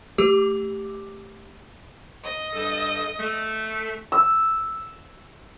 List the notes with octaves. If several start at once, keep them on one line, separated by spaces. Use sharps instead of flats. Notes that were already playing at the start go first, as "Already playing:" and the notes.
A3 G4 D6 E6
D#5
G2 A4
A3
E6